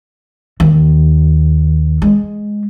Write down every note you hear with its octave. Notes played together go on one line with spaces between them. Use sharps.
D#2
G#3